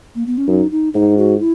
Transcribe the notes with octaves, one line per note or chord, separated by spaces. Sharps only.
A#3
B3
C#4
F#2 D#4
D#4
G#2 D#4
F#4
E4